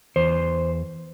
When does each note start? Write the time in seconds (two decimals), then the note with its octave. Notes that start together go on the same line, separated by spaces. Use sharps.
0.16 E2 C5